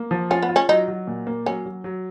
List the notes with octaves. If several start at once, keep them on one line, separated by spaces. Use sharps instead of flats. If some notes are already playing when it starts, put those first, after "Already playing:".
Already playing: A#3
F3
C#4 F4
B3
F4
C#4
F#3 D#4
F#3
A#2
A#3
F#3 C#4
F#3
F#3